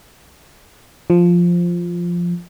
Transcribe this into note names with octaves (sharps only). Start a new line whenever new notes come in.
F3